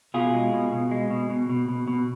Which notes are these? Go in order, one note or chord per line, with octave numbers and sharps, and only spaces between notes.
B2 F4 G#4
G#3
B2
B2
G#3
B2
B2
B2
B2
B2